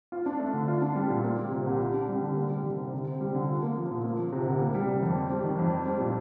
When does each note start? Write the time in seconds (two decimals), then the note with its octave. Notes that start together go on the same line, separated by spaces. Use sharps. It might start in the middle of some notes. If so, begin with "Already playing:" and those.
0.12 F4
0.26 D4
0.39 A3
0.53 D3
0.68 F4
0.82 D4
0.96 G3
1.10 A#2
1.24 A#3
1.38 G3
1.52 C3
1.66 C2
1.80 F4
1.94 D4
2.09 G3
2.22 D3
2.37 A#3
2.50 G3
2.64 D#3
2.78 C3
2.92 D3
3.06 C4
3.21 G3
3.35 D3
3.48 F4
3.63 A#3
3.77 F3
3.91 A#2
4.04 A#3
4.18 F3
4.32 C3
4.46 D2
4.61 A#3
4.74 G3
4.88 C3
5.03 F2
5.16 C4
5.30 G3
5.44 D#3
5.59 F2
5.73 C4
5.86 G3
6.00 A#2